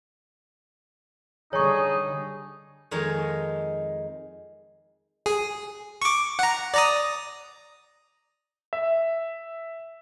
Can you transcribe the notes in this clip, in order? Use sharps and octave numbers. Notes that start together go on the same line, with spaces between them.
D3 G3 D#4 G#4 C#5 C#6
F2 D#3 G#3 D#4 A#4 C#5
G#4
C#6 D6
F#5 A#5
D5 A#5 D#6
E5